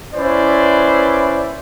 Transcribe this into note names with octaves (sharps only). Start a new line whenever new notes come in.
C#4 E4 B4 C5 D5